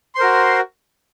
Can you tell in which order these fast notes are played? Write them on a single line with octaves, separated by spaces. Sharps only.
C6 C5 A#4 F#4